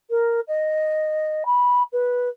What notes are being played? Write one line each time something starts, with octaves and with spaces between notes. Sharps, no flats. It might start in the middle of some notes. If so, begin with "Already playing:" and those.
A#4
D#5
B5
B4